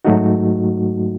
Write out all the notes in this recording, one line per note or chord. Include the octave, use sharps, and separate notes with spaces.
G#2 F#3 A3 D#4 F#4